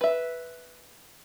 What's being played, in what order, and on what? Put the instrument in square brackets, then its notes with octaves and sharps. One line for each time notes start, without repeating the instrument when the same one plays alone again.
[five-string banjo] B4 E5